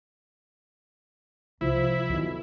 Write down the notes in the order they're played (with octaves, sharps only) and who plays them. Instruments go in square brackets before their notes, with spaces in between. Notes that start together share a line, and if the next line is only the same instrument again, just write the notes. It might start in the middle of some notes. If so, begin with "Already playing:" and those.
[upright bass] C2 [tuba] F3 [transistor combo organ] E4
[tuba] B1 [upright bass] D#3